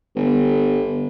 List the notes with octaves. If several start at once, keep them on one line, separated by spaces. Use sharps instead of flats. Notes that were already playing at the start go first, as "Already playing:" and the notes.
G1